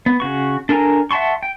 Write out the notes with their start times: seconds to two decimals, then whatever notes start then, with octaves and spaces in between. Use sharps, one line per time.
0.06 B3
0.20 C#3 F#4 C#6
0.69 D4 A4 A#4 G#5 A#5
1.11 E5 F#5 A5 C6 C#6
1.43 G5